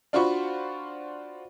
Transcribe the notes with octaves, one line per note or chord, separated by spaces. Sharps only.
D4 F4 F#4 C5 B5 C#6